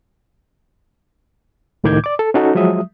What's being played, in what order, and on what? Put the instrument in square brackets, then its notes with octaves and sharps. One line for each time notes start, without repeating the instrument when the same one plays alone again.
[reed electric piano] C#2 A2 D#3 D6 G6 G#6
D5 D6
A4
C#4 D#4 F#4 A4
F3 F#3 G#3 E5 D#6